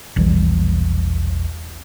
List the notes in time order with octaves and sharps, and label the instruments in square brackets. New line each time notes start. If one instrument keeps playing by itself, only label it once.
[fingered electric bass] E1 A#1 E3 G3